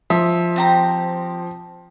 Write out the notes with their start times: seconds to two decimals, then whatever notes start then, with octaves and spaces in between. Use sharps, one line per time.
0.10 F3 E5
0.56 C4 G4 A#5